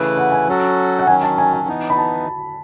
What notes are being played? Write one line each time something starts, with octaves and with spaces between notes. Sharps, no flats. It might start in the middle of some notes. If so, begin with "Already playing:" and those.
Already playing: C#3 E3 A3 E4 B4
F#5
G#5
F#3 C#4 F#4 A4
F#5
D#3 F#3 C#4 G#5
A5
G#5
G#5
E3 B3 D#4
B5
A5